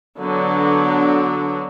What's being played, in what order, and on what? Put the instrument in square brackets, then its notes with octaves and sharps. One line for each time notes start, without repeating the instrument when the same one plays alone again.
[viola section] D3 F#3 B3 D4